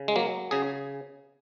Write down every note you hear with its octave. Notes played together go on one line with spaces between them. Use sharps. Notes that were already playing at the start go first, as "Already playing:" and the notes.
Already playing: C#3
G#3
F#3 A#3
C#3 G#4